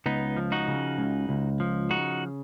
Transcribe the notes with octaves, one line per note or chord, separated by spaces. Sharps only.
C#2 B3 D#4
F3
D#4 F#4
C#3
C#2
C#2
F3
C#3 D#4 F#4